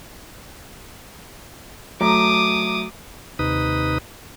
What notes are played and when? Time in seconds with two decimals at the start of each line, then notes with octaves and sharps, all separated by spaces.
2.00 F#3 A3 A#5 D6 D#6
3.39 D#2 C3 D#4 B4 D#6